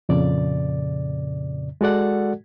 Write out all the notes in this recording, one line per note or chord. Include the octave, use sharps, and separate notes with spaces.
F2 A#2 C#3 D5
G#3 F#4 A4 D5 F#5